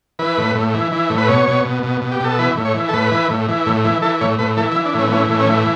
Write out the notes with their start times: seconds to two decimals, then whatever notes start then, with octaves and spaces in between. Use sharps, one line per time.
0.19 E3 B4
0.38 A2
0.55 A2
0.74 E3
0.92 E3
1.10 A2
1.18 B4
1.28 B2 C#5
1.47 B2
1.65 B2
1.83 B2
2.01 B2
2.12 G4
2.20 B2 A4
2.38 E3 B4
2.57 A2
2.65 C#5
2.74 E3
2.89 A4
2.93 A2 B4
3.12 E3
3.30 A2
3.48 E3
3.66 A2
3.84 E3
4.02 E3 A4
4.21 A2 C#5
4.39 A2 B4
4.57 E3 A4
4.72 E4
4.76 E3
4.85 D4
4.94 A2 C#4
5.08 B3
5.12 E3 C#4
5.30 A2
5.39 C#4
5.49 E3